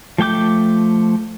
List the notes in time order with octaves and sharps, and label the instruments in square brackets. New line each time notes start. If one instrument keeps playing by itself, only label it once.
[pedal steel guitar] F3 A3 G5 D6 G6